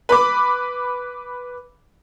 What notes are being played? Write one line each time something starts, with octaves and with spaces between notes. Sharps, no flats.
B4 B5 D6